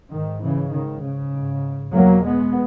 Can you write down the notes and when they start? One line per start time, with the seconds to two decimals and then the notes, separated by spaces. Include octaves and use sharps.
0.11 G#2 D#3
0.42 C#3 E3
0.72 G#2 D#3
1.03 C#3
1.33 G#2
1.93 E2 B2 F#3 A#3
2.24 G#3 B3